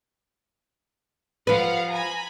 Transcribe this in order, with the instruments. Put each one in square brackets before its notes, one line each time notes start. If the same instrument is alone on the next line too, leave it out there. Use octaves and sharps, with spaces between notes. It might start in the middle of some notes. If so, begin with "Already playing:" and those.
[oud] F3 B4 [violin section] F5 F#5
[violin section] G#5 A#5 B5